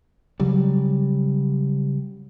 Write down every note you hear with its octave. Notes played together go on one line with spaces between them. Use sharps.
C#3 F#3 G3